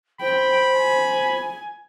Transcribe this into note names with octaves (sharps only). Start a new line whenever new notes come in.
C5 G5 B5
G#5